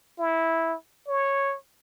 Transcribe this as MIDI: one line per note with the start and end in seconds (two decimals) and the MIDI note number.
0.18 0.75 64
1.08 1.55 73